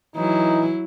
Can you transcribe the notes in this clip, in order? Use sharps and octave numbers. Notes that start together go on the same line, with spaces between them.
E3 F#3 D#4 E4